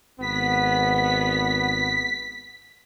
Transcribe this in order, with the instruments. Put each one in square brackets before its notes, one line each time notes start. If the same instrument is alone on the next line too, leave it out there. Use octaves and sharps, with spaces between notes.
[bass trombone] G#1 [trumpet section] B3 [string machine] B6